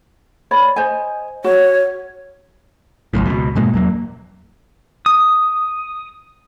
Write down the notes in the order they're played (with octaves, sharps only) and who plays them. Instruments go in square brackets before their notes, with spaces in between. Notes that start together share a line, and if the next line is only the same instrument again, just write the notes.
[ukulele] C#5 D5 B5
C5 D#5 G#5
[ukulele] F#4 [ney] C#5
[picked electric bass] G#1 C#2 F#2 A2
C#2 B2
G#2 B2 G#3 A#3
E2 F#3 A#3
[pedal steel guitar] D#6